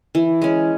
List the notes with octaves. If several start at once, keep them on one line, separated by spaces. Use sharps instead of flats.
E3
G#3 C#4